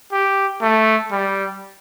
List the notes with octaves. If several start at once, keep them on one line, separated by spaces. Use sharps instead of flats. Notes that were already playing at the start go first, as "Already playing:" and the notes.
G4
A3
G3